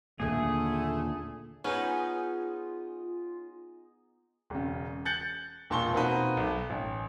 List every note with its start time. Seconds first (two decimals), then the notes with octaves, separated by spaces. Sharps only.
0.20 D#2 A#2 D3 A3 A#3 G#4
1.64 B3 C#4 D#4 F4 G#4 B4
4.50 E1 C#3
5.05 F#6 G6 A6 C#7 F#7
5.70 E1 A#2 A5 C6 C#6 G7
5.93 B2 A#3 C4 D#4 F#4 B4
6.37 B1
6.70 A1